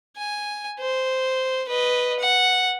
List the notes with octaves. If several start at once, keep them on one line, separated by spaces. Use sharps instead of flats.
G#5
C5
B4 D#5
F#5